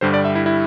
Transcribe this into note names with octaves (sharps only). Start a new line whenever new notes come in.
G2 D3 G3 C5
D5
E5
E4
E4